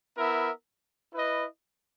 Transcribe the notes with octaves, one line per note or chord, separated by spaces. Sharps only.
B3 E4 A#4 E5
E4 B4 D#5